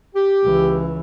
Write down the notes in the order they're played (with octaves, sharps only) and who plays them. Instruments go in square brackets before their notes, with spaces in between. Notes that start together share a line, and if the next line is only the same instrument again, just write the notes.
[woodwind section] G4
[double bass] C#2 E3